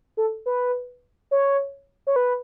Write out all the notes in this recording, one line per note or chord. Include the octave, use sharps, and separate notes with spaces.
A4
B4
C#5
C#5
B4